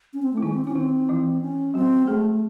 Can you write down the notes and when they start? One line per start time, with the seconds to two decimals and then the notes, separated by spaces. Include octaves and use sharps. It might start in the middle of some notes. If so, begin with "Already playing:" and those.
0.14 C#4
0.22 C4
0.33 A3 E4
0.42 D#3 G#3 D#4
0.54 C4
0.65 C#4 E4
0.75 D#3 C4 D#4
1.09 E3 E4
1.41 C#4
1.74 F#3 C4 F#4
2.07 G#3 A3 G#4